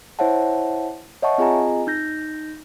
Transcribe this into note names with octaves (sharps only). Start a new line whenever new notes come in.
E4 C5 C#5 E5 F#5 A5
C#5 D#5 E5 F#5 A5 C#6
C4 F4 G#4 D#5 G#5 A#5
D#4 G6 A#6